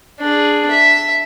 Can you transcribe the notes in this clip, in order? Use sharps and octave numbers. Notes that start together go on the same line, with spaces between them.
D4 G#4
E5